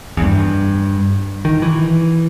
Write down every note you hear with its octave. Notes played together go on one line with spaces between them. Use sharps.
E2
G2
D#3
E3